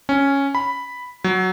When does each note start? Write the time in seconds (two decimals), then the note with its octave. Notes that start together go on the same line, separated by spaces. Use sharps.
0.09 C#4
0.55 B5
1.24 F#3